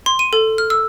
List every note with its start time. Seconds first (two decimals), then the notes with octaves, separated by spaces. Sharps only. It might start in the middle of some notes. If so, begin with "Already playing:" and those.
0.06 C6
0.19 D#7
0.33 A4
0.58 F6
0.70 E6